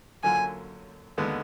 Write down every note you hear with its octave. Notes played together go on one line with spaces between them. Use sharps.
F#2 D3 F#3 A#3 F4 G#5
D#2 D3 G#3 B3